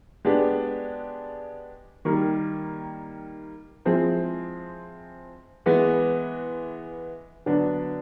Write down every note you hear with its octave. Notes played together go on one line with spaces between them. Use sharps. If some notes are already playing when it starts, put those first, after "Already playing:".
G#3 B3 D4 G4
D#3 G3 A#3
F3 G#3 C4 E4 G#4
E3 G#3 B3
D3 F#3 B3 D4